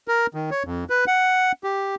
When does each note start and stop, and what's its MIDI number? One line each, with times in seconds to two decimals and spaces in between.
0.08 0.27 70
0.34 0.50 51
0.51 0.63 73
0.65 0.84 41
0.90 1.05 71
1.07 1.52 78
1.64 1.95 67